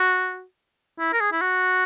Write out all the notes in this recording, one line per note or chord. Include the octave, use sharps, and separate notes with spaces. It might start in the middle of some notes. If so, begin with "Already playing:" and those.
Already playing: F#4
E4
A#4
G#4
E4
F#4